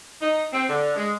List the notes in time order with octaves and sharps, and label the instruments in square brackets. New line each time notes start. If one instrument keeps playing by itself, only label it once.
[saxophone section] D#4
C4
D3
G#3